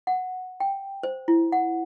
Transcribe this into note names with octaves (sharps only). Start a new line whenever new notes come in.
F#5
G5
C5
E4
F#5